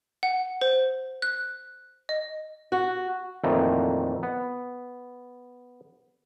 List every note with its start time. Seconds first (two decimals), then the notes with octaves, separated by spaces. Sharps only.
0.23 F#5
0.61 C5
1.22 F#6
2.09 D#5
2.72 F#4
3.44 F2 A#2 D#3 E3 F#3 A3
4.23 B3